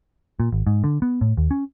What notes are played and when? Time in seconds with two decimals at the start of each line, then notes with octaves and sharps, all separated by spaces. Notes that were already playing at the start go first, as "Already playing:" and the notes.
0.40 A#2
0.52 G#1
0.67 G#2
0.84 D3
1.02 B3
1.21 A2
1.37 D#2
1.51 C#4